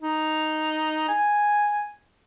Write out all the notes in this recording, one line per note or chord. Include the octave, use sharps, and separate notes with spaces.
D#4
G#5